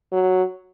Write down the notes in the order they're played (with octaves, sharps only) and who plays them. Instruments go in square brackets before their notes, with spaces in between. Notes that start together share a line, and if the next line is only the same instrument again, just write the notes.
[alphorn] F#3